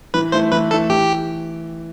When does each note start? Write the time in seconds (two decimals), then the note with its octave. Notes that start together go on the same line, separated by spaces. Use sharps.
0.14 E3 B4
0.32 A3 E4 C5
0.52 E3 B4
0.71 A3 E4 A4
0.90 E3 G4